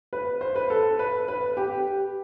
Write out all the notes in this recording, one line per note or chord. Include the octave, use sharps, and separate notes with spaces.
B4
C5
B4
A4
B4
B4
G4